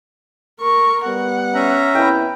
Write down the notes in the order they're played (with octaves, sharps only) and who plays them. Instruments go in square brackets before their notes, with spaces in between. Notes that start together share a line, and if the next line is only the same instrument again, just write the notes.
[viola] A#4 C#6
[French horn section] G3 B3 [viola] F#5
[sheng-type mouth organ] C#4 E5 A#5
[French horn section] C3 B3 E4 [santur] G5 B5